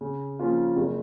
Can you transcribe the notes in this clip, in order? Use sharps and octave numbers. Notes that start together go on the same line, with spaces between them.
C#3
F3 A#3 C#4 F4
F#1